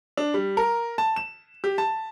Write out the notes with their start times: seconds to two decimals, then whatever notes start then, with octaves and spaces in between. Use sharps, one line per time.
0.17 D4
0.34 G3
0.57 A#4
0.98 A5
1.16 E7
1.64 G4
1.78 A5